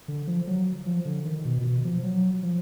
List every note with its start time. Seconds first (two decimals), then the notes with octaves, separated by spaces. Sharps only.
0.08 D3
0.27 F3
0.47 F#3
0.86 F3
1.05 D3
1.25 D#3
1.45 B2
1.58 A#2
1.64 B2
1.84 F3
2.03 F#3
2.43 F3